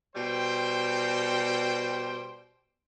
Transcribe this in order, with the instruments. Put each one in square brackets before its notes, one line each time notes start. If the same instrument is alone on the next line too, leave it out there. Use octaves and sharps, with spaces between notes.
[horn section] B2 G3 C5 G5